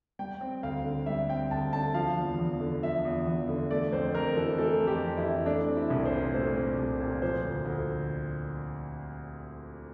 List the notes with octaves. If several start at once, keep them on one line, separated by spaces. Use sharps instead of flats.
G3 G5
C4
D2 F5
D3
G3 E5
C4 G5
D2 A5
D3 A5
F3 F5
E2
E2
D3
F3 E5
E2
E2
D3
A3 D5
F2 C5
F2 A#4
E3 A4
A3 A4
F2
G4
F2
E4
E3
A3 D4
C4
E4
C2
C5
A#2
A3 C5
C4
C2
A#2
F3 C5
D2
D2